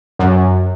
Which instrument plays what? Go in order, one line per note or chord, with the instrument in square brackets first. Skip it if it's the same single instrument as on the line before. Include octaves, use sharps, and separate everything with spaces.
[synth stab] F#2